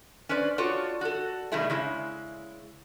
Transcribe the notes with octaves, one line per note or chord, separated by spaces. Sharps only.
C#4 B4 C5 D5
F4 F#4 A4 C#5 D5
F#4 A4
B2 D#3 G3 A3 E4 G#4
C#3 G#3 E4